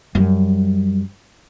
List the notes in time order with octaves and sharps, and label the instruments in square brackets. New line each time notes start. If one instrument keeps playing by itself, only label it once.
[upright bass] F#2 G3